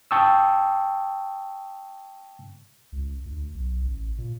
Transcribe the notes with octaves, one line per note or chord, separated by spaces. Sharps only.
G5 A5 C#6 D#6 E6
C#2
D2
B1
A1
A#2